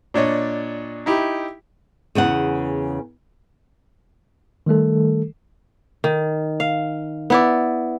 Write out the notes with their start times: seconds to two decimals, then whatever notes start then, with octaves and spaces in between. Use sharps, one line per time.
0.14 A#2 D4 C#5 D#5
1.06 D#4 E4 G4
2.15 E2 C#3 B3 F#5
4.66 D#3 G3 A3 A4
6.04 D#3
6.60 F5
7.30 B3 E4 D5